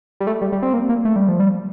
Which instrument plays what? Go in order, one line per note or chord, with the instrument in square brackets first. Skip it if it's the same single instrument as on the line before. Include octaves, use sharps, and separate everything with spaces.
[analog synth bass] G3
A3
G3
G3
C4
A#3
A#3
A3
G3
F3
G3